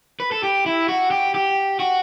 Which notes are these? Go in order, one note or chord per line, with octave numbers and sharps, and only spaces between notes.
B4
A4
G4
E4
F#4
G4
G4
F#4